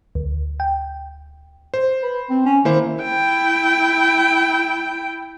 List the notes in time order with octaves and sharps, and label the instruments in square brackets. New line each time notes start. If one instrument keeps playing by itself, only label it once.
[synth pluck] D2
G5
[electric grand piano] C5
[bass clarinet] B4
C4
C#4
[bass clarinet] D#3 [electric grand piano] A#3 E4 C5
[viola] E4 G5